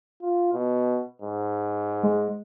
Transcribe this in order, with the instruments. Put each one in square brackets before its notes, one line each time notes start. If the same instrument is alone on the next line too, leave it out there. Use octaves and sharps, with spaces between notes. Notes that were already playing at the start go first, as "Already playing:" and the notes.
[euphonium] F4
B2
G#2
[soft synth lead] G#3